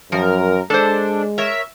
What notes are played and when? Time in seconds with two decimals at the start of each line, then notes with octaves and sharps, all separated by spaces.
0.12 F#2 F3 A#4
0.70 G#3 D4 A4 C5
1.38 A#4 C#5 E5